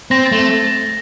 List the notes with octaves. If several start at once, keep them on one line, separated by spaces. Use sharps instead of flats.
C4 A#6
A6
A3
A6